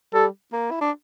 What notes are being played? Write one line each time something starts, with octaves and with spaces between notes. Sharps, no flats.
G3 A4
A#3
E4
D4